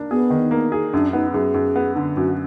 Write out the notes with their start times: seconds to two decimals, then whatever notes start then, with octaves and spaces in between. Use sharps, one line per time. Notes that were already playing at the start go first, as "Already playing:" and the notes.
Already playing: A#3 D4
0.11 B3 G#4
0.30 D#3
0.51 A#3
0.72 G#4
0.93 F#2 D4
1.13 B3 D#4
1.34 F#2 G#4
1.54 F#2
1.76 B3
1.96 D3
2.17 F#2 F#4